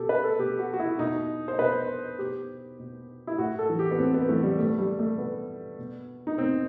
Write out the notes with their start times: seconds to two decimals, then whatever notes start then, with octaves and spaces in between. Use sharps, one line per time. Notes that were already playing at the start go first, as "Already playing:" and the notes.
Already playing: B2 G4 A4
0.09 B4
0.24 A4
0.39 B2 G4
0.59 F#4
0.73 F#4
0.79 E4
0.99 B2 D#4
1.48 C5
1.59 B2 B4
2.19 B2 G4
2.79 B2
3.27 E4
3.38 A2 F#4
3.59 A4
3.69 E3
3.79 G4
3.91 B3
3.98 A2 C4
4.14 B3
4.29 E3 A3
4.43 G3
4.58 B2 A3
4.78 G3
4.99 A3
5.18 B2 B3
5.78 B2
6.27 D#4
6.38 B2 C4